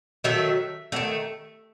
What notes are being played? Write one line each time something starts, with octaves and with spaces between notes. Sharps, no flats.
D#3 F#3 A3 E5
D#3 F#3 A3